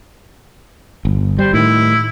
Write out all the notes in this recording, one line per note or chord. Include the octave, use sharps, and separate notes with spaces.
G1
G3 C5
A2 D#3 E4